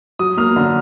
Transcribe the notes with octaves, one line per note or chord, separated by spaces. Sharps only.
F#3 D#6
A#3 F6
D3